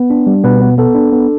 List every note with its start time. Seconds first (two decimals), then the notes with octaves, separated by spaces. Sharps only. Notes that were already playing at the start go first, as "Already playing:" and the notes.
Already playing: B3
0.10 D4
0.27 G3
0.44 B2 B3 B4
0.61 B3
0.78 B3 A4
0.95 D4
1.12 B3